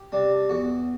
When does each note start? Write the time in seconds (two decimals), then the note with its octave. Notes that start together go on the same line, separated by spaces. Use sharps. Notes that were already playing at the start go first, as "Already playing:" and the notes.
Already playing: G4
0.12 C3 G3 D4
0.49 E2 F#4